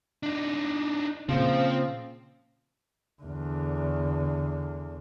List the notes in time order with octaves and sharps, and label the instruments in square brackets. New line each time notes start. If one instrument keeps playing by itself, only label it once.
[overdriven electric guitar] D4 D#4
[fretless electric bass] A#2 C#3 [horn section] F3 [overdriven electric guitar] C4
[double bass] E2 D3